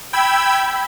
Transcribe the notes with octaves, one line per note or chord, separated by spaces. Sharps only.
G5 B5 E6 G#6